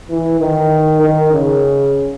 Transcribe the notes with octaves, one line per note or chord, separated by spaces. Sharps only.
E3
D#3
D#3
C#3